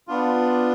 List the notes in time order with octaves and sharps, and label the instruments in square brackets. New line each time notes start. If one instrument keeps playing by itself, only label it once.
[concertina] B3 D4 F4